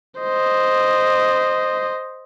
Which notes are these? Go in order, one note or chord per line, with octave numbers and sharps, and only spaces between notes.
C5 D#5